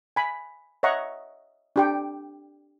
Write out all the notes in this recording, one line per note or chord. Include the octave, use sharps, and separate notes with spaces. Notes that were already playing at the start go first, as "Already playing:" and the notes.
G#5 B5
C#5 D#5 E5 F#5 A#5 C#6
D4 G4 G5